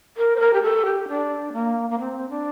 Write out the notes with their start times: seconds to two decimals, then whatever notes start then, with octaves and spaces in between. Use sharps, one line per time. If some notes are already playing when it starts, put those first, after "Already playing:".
0.17 A#4
0.36 C5
0.40 A#4
0.53 G4
0.63 A4
0.85 G4
1.08 D4
1.53 A#3
1.90 A#3
1.99 C4
2.30 D4